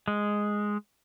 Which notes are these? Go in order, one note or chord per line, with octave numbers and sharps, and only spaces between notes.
G#3